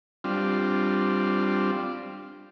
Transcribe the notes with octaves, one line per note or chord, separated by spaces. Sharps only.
G3 C4 D4 F4